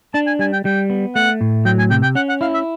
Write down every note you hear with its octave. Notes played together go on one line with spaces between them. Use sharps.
D4 A5
G#5
G3 G#5
G5
G3 G5
B3
A3 F#5
A2
F#3 G5
G#5
C3 G5
G5
C#4 F#5
F#5
E4 F5
E5